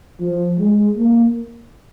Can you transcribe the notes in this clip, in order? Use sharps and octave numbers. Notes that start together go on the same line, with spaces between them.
F3
G#3
A#3